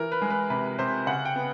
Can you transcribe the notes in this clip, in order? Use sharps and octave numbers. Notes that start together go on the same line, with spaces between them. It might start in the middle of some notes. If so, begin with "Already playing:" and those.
Already playing: E3 A#4
B4
G#3
B4
C3 B4
C3 C5
C#3 F#5
G5
B3